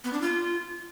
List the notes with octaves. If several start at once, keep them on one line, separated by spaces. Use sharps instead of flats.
B3
D4
F4